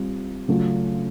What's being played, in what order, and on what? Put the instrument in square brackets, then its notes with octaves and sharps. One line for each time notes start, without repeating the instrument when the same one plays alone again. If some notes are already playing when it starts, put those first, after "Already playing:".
Already playing: [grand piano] G3 C4 F4
C#3 F#3 A3 C#4 F4